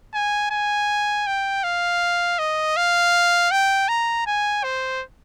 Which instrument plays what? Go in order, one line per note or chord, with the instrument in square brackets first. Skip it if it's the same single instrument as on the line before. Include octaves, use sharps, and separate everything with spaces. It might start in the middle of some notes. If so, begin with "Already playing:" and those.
[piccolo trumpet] G#5
G#5
G5
F5
D#5
F5
G5
A#5
G#5
C5